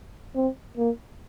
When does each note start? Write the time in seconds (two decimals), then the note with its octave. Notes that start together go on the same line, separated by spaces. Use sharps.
0.36 C4
0.77 A#3